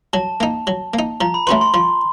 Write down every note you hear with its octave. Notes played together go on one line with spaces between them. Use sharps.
F#3 A5
A#3 D#4
F#3
A#3
D#4
F3 A#5
B5
A3 C#4 F#4 B4 C6
C6
F3 C6